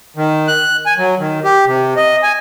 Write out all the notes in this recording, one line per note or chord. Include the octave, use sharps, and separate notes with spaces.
D#3
F#6
G#5
F#3
D#3
G4
C3
D#5
G#5